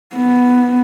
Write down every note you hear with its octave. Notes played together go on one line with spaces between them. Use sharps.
B3